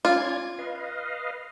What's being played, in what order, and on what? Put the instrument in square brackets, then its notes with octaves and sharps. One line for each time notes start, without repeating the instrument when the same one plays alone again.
[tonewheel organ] C#4 D5 G#6 [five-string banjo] F4
[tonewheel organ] B4 D#5 F5